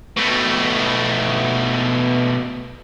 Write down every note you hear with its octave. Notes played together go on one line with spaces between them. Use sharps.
B2 A3